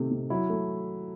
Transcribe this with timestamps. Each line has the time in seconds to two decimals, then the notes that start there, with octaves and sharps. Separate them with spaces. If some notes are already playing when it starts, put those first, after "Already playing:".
Already playing: C3 D#3 A3
0.11 C3
0.30 F#3 E4
0.50 A3